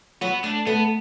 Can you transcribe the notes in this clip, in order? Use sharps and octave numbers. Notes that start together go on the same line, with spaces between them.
F#3 B3 F#4
A3 D4
A3 B3